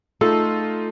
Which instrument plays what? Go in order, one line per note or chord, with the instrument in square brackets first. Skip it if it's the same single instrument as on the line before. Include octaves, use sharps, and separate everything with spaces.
[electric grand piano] A3 D#4 F4 [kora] A4